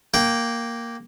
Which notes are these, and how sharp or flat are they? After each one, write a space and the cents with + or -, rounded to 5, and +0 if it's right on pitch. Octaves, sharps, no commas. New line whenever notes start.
A#3 +0 G5 -10